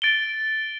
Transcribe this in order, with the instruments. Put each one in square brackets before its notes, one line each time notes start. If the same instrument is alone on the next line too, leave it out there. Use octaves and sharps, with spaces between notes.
[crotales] A6 D7 G7